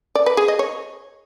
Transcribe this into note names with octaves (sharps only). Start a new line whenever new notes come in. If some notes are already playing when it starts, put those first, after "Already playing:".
D5
B4
G#4
D#5
C#5